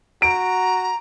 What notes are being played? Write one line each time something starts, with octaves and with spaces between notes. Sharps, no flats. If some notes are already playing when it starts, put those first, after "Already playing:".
F#4 A#5 D7